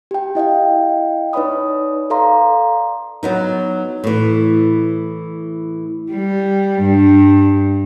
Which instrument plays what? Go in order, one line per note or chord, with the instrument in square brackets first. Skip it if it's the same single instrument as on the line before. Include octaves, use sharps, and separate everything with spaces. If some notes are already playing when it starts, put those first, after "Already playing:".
[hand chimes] G4 G5
E4 D#5 F5 G5
D#4 B4 C#5 D5 B5 D#6
A4 D5 F5 A#5 C6
[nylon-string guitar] F#3 B3 D#4
A2 E3
[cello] G3
G2